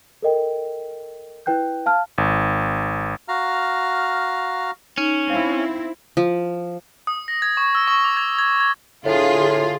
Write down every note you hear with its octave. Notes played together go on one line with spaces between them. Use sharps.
A4 A#4 D#5 G5
E4 B4 G5 F#6 G6
F5 A5 F6
G#1
F#4 F5 A#5 F6
C#4 D#4
C4 E4 F5
F3
D#6
A#6
G#6
C#6
E6
C#6
D6
G#6
G#6
G#6
A2 D3 F4 G#4